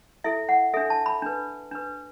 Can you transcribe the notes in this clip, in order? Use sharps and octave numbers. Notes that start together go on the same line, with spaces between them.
E4 A4 E5
F#5
D4 A4 E5
A5
B5
D4 B4
D4 B4